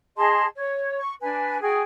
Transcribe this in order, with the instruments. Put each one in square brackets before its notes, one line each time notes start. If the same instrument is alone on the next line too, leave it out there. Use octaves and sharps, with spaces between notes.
[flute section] G#4 D#5 A5 C6
C#5
C#6
D4 B4 G#5
F#4 G#4 G5 G#5